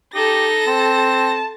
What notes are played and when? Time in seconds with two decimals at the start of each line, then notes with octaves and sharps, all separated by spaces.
0.14 D#4 G4 A4 A#6
0.67 C4 A5